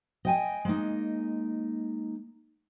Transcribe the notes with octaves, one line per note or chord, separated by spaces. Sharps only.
D#5 G5 G#5
G#3 A#3 D#4